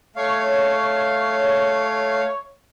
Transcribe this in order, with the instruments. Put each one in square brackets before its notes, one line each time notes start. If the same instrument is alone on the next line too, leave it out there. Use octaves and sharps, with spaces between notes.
[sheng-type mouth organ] A3 F5 [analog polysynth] C#5